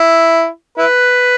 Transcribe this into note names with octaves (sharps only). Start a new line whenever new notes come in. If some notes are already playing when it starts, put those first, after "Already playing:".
Already playing: E4
E4 B4